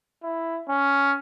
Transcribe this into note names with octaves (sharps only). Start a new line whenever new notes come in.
E4
C#4